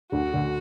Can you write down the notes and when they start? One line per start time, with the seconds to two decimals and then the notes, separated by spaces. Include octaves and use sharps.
0.12 D2 D3 F#4
0.34 D2 D3